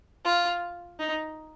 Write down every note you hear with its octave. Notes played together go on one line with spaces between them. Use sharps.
F4
D#4